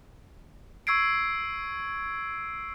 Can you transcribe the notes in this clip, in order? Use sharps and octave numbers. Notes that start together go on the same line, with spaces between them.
C#6 E6 G#6 C7 D7